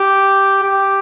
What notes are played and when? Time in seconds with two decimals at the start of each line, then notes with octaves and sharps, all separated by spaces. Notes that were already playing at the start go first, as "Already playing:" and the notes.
Already playing: G4
0.63 G4